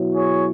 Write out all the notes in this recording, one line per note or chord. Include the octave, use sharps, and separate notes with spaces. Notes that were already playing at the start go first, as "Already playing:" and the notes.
Already playing: B2 F#3 E4
G#4 C#5